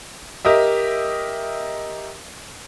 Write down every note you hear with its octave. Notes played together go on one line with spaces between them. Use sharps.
G4 A#4 D#5 E5